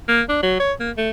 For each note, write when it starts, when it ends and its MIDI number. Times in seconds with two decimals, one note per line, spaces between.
0.08 0.22 58
0.29 0.40 62
0.43 0.57 54
0.60 0.73 73
0.80 0.91 58
0.97 1.11 57